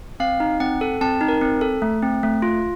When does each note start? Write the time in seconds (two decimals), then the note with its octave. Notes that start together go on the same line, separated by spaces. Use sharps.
0.20 C4 F5
0.40 D#4
0.60 C4 F#5
0.81 A4
1.01 C4 A5
1.21 D#4
1.28 A#4
1.41 C4
1.61 A4
1.82 A3
2.02 C4
2.23 A3
2.42 F4